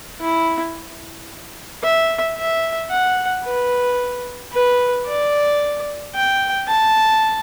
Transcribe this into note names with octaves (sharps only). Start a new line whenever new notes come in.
E4
E5
E5
F#5
B4
B4
D5
G5
A5